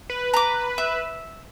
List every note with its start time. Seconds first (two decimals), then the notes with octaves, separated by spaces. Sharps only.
0.10 B4
0.34 A#5 D6
0.78 E5